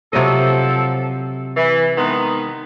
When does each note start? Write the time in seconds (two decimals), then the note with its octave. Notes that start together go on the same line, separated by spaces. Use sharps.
0.13 C3 F3 F#3 A4 D#5
1.57 E3
1.97 D#3 G#3 B3